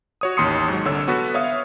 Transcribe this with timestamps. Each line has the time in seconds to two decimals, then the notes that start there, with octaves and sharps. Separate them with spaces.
0.21 F#4 C#5 D#6
0.37 A1 D#2 C6 D#6 C#7
0.68 G#2 F#3
0.85 C2 D3 C#5 E6
1.08 B3 F#4 A4 B4
1.34 C#5 E5 F5 D#6